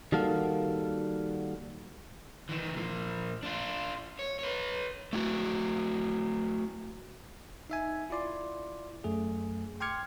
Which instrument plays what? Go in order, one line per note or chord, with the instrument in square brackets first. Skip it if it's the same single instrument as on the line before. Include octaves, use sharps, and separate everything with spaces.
[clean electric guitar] D#3 G3 A#3 F#4 A4 F5
[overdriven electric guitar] D#3 E3
A#2 F3
D4 F4
C#5
B4 C#5
[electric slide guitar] A3 E4 F#4
[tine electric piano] D#4 E5 G#5
E4 F4 D5 C6
F#2 A3 G#4
G5 C6 D6 F6 G#6 C#7